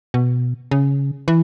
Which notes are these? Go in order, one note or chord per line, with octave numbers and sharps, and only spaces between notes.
B2
C#3
E3